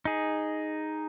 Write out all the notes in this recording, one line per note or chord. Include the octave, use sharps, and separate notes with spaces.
D#4 G#4